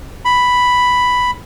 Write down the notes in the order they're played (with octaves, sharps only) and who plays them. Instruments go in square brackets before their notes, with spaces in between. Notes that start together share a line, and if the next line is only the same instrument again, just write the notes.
[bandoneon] B5